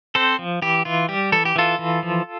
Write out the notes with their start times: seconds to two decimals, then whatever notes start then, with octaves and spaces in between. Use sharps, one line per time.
0.15 C4 A4 C5
0.39 F3
0.62 E3 G4
0.85 E3 F4
1.09 G3 G4
1.32 E3 A4
1.45 G4
1.56 E3 F4 A4
1.79 E3
2.03 F3